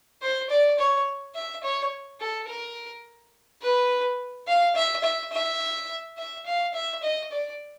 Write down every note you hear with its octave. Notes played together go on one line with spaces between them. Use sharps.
C5
D5
C#5
E5
C#5
A4
A#4
B4
F5
E5
E5
E5
E5
F5
E5
D#5
D5